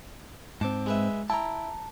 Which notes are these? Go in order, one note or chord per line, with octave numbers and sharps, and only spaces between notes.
G#2 C4 A5 D6
G#3 B4 E5
E4 G5 A5 A#5